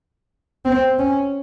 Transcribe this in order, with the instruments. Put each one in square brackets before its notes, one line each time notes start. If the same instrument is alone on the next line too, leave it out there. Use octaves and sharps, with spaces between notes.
[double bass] C4
C#4